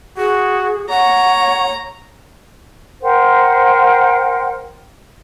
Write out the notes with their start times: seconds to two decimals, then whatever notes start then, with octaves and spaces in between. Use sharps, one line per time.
0.17 F#4 G#4
0.90 C#5 F#5 A#5
3.01 A#4 C5 F#5 G5